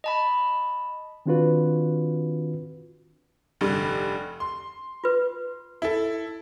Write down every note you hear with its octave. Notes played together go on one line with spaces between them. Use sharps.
D#5 A5 B5
D#3 C4 D4 F4 F#4 B4
F1 G2 D3
C6
F4 B4
E4 A4